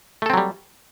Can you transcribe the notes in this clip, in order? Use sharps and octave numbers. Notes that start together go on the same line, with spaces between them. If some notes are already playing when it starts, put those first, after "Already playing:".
F#3 G3 A3 C4 A4